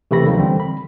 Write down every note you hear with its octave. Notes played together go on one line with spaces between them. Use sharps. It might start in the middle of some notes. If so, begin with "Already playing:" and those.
C3 E3 A3 A4 B5 A#6
D#3 F3 F#3 A#3 C4
D3 E3 G3 C4
B5